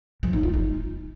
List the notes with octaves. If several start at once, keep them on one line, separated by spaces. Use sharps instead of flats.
F3
D#4
F4
D#4